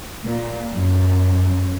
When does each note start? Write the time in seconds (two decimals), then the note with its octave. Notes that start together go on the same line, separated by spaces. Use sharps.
0.25 A#2
0.74 F#2